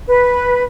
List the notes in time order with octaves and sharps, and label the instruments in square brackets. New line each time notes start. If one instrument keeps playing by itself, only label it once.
[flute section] B4